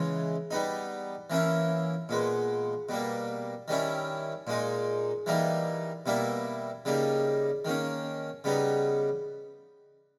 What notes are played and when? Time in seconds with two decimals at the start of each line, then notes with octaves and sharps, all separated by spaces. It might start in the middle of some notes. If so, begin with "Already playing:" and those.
Already playing: C#3 E3 G#3
0.51 G3 B3 D#4
1.30 E3 A#3 C#4 E4
2.09 A#2 G#3 B3
2.89 B2 G3 A#3
3.68 D#3 G3 C#4 E4
4.47 A#2 G#3 D#4
5.26 E3 G3 A#3 D#4
6.06 B2 G3 A#3 E4
6.85 C#3 G3 A#3 D#4
7.65 D#3 A#3 C#4
8.44 C#3 G3 B3 D#4